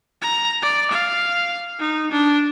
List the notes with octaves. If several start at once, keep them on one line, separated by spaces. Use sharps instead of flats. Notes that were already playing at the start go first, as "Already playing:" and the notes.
A#5
D5
F5
D#4
D4